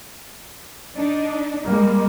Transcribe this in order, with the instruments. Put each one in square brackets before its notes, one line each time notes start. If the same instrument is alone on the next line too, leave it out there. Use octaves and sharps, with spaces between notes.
[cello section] D4 D#4
[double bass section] G3 A#3 [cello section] G#3